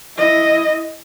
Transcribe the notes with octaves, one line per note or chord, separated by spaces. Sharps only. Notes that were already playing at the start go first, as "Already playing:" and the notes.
E4 D#5